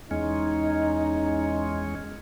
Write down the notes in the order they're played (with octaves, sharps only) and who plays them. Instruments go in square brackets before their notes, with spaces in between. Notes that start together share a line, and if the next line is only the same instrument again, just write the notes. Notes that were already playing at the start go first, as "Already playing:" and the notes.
[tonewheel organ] E2 G#3 C#4 [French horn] D#4